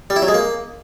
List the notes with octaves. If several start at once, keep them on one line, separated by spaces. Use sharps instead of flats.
G3
E4
F#3
G#3
A#3